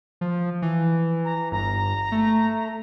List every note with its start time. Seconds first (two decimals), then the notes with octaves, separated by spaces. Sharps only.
0.21 F3
0.62 E3
1.25 A#5
1.52 G1 A#5
2.12 A3